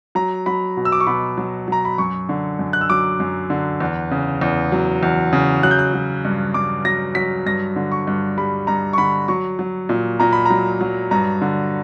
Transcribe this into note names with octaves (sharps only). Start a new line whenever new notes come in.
F#3 A#5
F#3 B5
B2
E6
D6
C#6
B2 B5
F#3
F#3 A#5
B5
F#2 C#6
D3
F#2
F#6
E6
F#3 D6
F#2
D3
E2
C#3
E2
F#3
E2
C#3
F#3 F#6
G6
F#6
F#3
G2
G2 D6
F#3 A#6
F#3 B6
G2 A#6
D3
C#6
G2
G3 B5
G2 A#5
C#6
D3 B5
F#3 C#6
F#3
A#2
A#2 A#5
B5
F#3 A#5
F#3
G2 A#5
D3